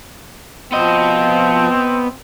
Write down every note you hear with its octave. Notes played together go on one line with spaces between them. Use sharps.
F3 B3 C4 D#5